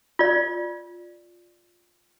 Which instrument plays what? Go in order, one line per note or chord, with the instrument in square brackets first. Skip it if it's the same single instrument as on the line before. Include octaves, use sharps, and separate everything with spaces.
[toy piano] F4 D5